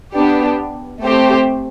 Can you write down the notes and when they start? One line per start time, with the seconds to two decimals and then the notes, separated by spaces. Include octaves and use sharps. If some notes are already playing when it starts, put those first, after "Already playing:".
0.16 B3 D4 G4
1.03 A3 C4 G4 C5